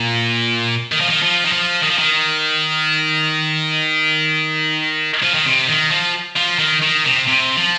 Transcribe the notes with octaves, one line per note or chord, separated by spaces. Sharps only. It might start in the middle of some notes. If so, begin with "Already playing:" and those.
Already playing: A#2
D#3
F3
D#3
F3
D#3
F3
D#3
F3
D#3
F3
D#3
C3
D#3
F3
F3
D#3
D#3
C3
C3
F3